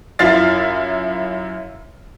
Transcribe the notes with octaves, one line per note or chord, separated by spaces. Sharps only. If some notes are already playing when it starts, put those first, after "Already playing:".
F#2 E4 F4 F6 A6 C7